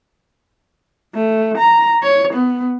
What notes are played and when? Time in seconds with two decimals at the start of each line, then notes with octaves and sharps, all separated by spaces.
1.15 A3
1.58 A#5
2.03 C#5
2.34 B3